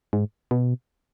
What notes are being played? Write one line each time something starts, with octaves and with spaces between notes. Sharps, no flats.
G#2
B2